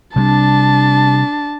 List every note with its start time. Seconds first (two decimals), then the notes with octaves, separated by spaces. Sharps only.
0.16 C3 G3 D4 A5